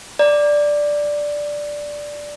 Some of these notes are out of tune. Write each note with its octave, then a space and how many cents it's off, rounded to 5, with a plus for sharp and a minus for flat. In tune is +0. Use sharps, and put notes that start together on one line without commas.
D5 +0 A#5 +0